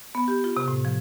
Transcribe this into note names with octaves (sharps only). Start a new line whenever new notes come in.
B3
G4
F4
C3
A2
F3